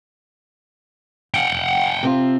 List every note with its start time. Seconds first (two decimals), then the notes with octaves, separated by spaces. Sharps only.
1.34 F#5 G5
2.03 C3 C4 F4